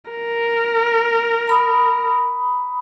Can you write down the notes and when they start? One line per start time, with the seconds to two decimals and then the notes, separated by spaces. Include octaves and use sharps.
0.11 A#4
1.47 A#5 B5 D#6